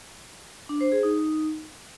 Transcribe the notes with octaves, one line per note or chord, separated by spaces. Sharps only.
D4
C5
G#4
D#4